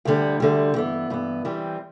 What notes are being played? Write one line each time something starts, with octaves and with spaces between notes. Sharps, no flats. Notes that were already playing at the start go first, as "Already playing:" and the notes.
D2 D3 G3
D2 D3 G3
G2 E3 B3
G2 E3 B3
E3 G3 C4